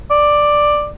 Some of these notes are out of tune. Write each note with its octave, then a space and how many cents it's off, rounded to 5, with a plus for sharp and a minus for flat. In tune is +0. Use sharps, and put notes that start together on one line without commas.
D5 +5